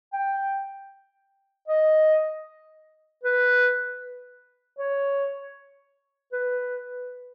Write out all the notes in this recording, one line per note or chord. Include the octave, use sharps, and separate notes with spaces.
G5
D#5
B4
C#5
B4